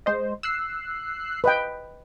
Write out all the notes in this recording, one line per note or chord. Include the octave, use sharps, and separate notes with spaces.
G#3 C5 D#5
E6 F#6 C7
B4 D#5 G5